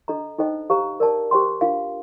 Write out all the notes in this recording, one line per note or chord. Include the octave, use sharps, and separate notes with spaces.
D4 A4 D#5 A#5
D#4 A4 C5 D#5 G5
G4 C5 F5 A#5
A#4 D5 A5
G4 C5 G5 C6
D4 F4 A#4 F5